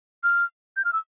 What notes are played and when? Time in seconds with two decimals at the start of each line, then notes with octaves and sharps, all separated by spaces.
0.23 F6
0.77 G6
0.85 F6
0.93 E6